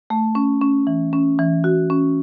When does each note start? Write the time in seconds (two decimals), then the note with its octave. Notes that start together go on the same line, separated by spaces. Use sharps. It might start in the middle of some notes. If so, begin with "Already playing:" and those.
0.10 A3
0.35 C#4
0.61 C#4
0.87 E3
1.13 C#4
1.39 E3
1.64 F#4
1.90 C#4